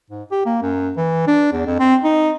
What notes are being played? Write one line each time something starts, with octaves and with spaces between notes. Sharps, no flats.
G#2
G4
A#3
F#2
E3
D4
E2
F2
C4
D#4